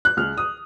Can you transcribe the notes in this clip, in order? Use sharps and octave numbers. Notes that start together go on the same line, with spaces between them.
F#6
C#2 F6
D#6